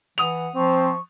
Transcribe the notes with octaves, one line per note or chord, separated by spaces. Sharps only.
E3 F#5 D#6 F7
F3 C4 C#6